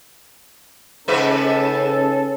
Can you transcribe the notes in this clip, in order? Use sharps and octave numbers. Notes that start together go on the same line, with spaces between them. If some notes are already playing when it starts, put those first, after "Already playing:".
G#2 C#3 C#4 A4 B4 E5